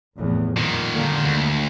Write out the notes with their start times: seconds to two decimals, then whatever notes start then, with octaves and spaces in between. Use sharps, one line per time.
0.18 F1 E2 A2
0.56 F2 A#2 D#3
0.93 D3 G#3 A#3
1.25 D2